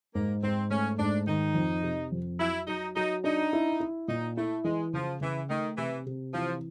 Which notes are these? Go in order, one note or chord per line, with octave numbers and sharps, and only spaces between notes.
G#2 A#3
G#2 C4
A3 C#4
G#2 D4
D#3 D#4
F2
C3
F2
F#3 E4
F#3 D#4
F#3 D#4
D4 D#4
E4
E4
A#2 D#4
A3 E4
E3 G#3
C#3 F3
C#3 E3
D#3 A3
C3 E3
C3
E3 F3